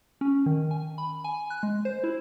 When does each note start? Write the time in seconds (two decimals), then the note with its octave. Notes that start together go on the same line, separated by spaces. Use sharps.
0.21 C#4
0.46 D#3
0.71 G#5
0.98 B5
1.24 G#5
1.50 F#6
1.63 G#3
1.85 C5
2.04 E4